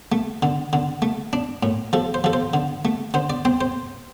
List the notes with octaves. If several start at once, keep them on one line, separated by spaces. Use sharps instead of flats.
A3
D3
D3
A3
D4
A2
F3 A4
C5
F3 A4
C5
D3
A3
D3 C5
D5
C4 C5
C5